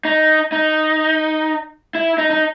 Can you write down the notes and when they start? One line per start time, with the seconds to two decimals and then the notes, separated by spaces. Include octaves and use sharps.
0.05 D#4
0.52 D#4
1.95 E4
2.18 D#4
2.31 D#4